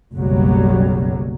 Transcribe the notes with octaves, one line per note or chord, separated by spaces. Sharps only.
F#1 B1 F#3 G3